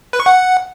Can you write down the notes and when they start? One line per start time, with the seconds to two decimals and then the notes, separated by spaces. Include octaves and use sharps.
0.13 B4
0.20 C#6
0.26 F#5